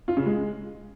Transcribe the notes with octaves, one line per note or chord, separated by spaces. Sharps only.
F4
C#3
G#3